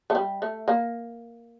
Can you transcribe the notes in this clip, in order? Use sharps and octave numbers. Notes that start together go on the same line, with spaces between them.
A3
G3
A3
A#3